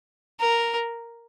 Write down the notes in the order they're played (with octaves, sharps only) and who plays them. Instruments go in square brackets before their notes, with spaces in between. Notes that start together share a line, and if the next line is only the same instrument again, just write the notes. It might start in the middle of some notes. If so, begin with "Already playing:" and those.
[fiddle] A#4